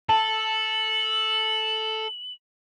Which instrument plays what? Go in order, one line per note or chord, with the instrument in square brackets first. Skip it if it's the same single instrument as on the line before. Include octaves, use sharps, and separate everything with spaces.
[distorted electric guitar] A4 [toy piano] A5 [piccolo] F#7